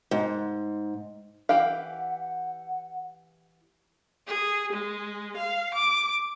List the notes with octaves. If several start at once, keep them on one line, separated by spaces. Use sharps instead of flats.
G#2
E3 G4 F5 F#5
G#4
G#3
F5
D6